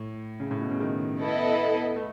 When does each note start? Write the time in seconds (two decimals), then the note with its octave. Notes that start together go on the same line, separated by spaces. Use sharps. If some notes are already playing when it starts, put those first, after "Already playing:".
Already playing: A2
0.40 C#3
0.51 A2
0.61 B2
0.71 C#3
0.80 D#3
1.20 B3 E4 A4 D#5
1.96 A3